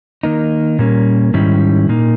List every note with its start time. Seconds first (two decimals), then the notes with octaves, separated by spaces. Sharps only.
0.23 D#3 A#3 D#4
0.79 A#2 G3 A#3 C#4
1.34 G#2 D#3 G3 C#4 E4
1.89 A#2 A#3 D#4